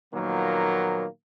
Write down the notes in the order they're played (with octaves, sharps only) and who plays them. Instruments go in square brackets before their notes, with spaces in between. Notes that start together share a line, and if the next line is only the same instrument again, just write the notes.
[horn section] A#2 D#3 F3 F#3 A#3 B3